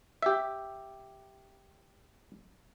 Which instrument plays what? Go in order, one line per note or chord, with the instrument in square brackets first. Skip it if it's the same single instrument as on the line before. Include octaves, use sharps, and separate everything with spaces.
[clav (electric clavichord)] G4 E5